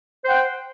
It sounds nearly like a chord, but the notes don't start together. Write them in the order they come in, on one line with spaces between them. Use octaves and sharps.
C5 F#5 G5